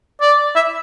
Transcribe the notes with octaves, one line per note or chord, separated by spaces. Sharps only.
D5
E5